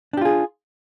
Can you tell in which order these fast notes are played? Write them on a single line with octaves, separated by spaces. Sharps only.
D4 G4 F4 G#4